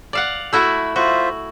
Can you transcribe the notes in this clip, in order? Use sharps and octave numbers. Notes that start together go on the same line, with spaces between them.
D5 F5 F#5
A3 E4 F#4
F4 F#4 C5 E5